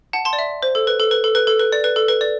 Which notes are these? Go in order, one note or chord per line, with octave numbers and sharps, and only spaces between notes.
F#5 A5
A5 C6
D5
E5
C5
A4
B4
A4
B4
A4
B4
A4
B4
D5
B4
A4
B4
D5